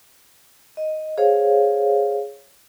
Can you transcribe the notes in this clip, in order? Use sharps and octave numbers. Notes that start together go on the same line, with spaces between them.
D#5
G#4 C5 C#5 F5